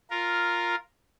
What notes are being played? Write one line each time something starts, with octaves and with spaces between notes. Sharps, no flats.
F4 A#4